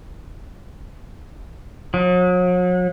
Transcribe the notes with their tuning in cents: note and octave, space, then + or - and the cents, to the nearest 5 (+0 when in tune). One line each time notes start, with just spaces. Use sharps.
F#3 -40